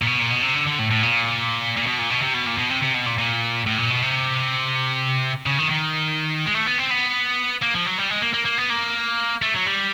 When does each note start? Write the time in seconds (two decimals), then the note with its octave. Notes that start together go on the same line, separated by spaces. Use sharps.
0.02 A#2
0.07 B2
0.19 A#2
0.30 B2
0.42 C3
0.55 D3
0.67 D3
0.79 A2
0.91 A2
1.03 A#2
1.77 A#2
1.87 B2
1.99 A#2
2.10 B2
2.22 C3
2.34 B2
2.47 A#2
2.58 B2
2.71 C3
2.83 C3
2.95 B2
3.06 A#2
3.18 A#2
3.66 A2
3.78 A#2
3.90 B2
4.02 C3
5.46 C#3
5.59 D#3
5.70 D#3
6.46 G#3
6.54 A3
6.66 B3
6.78 C4
6.90 B3
7.62 A#3
7.74 F3
7.86 F#3
7.98 G3
8.10 G#3
8.22 A#3
8.34 A#3
8.45 A#3
8.58 B3
8.70 A#3
9.42 A3
9.54 F#3
9.66 G3